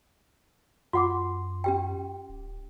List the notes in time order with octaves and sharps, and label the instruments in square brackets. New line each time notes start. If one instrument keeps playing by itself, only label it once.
[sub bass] F#2 [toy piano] F4 F#5 [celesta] C6 D6
[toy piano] C#4 G4 G5
[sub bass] D1